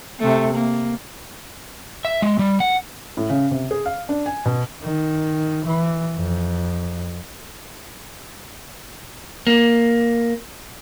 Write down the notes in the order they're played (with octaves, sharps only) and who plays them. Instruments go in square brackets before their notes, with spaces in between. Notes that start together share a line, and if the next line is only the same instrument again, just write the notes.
[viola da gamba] C3 A3
A#3
[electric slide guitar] E5
G#3
G3
F#5
[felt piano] A2
C#3
C3
G#4
F5
D4
G#5
B2
[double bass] D#3
E3
F2
[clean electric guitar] A#3